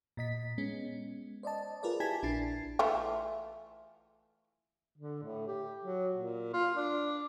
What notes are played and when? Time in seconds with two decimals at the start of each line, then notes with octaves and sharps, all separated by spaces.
0.17 A#2 D#5 B6
0.58 G#3 B3 C#4
1.43 C5 D5 D#5 A5
1.83 F4 G#4 A#4 B4 D5
2.00 E4 G4 G#5 A5 G#6 B6
2.23 A#1 D4 E4 A6 C7
2.79 E3 A3 F4
4.98 D3
5.23 A2
5.47 G4
5.85 F#3
6.15 A#2
6.54 F4
6.77 D4